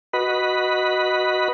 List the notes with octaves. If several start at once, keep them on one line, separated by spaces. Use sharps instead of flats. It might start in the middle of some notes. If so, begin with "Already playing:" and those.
F#4 B4 D#5 B5